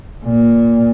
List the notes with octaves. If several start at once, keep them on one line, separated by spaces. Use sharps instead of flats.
A#2